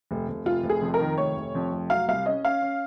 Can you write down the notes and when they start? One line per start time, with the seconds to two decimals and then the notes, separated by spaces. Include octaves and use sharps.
0.11 F1
0.29 F1
0.45 F1 F4
0.64 F1
0.70 G#4
0.82 F2
0.94 A#4
1.00 D#3
1.18 F1 C#5
1.36 F1
1.55 F2
1.72 F1
1.90 F#3 F5
2.08 C2 F5
2.26 C#4 D#5
2.45 C#4 F5
2.62 C#4